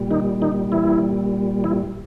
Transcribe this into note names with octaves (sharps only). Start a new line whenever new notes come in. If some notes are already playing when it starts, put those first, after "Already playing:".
Already playing: A#2 G3
D#3 D#4
D#3 D#4
E3 E4
E3 E4